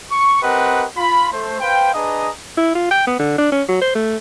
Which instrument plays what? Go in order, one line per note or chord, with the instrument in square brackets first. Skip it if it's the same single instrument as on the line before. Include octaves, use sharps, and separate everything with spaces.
[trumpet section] C#6
C4 G4 A#4 B4 D#5 F#5
F4 B5
A3 C5
B4 C5 F5 G5
D4 G#4 B4 D#5 A#5 D#6
[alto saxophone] E4
F4
G5
B3
D3
D4
C#4
F#3
C5
A3